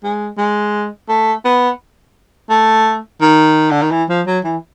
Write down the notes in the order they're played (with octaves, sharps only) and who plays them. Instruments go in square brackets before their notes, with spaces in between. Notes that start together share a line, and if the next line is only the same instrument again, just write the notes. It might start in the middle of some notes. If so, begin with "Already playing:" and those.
[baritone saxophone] G#3
G#3
A3
B3
A3
D#3
D3
D#3
E3
F3
F#3
E3